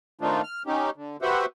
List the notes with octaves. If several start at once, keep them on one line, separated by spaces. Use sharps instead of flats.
D#3 A3 C4 D4 D#4 F4
F6
C#4 D#4 G4
D3
F#4 G4 B4 C5 E5 F#5